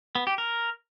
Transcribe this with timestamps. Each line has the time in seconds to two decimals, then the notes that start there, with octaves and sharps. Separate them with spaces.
0.15 B3
0.27 G4
0.38 A#4